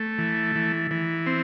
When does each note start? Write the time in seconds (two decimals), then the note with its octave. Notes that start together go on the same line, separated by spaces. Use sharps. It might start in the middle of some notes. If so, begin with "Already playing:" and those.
Already playing: A3
0.18 E3
0.56 E3
0.91 E3
1.27 C4